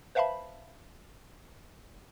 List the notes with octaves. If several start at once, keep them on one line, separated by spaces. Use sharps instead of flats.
B4 C5 E5 F5 A5 B5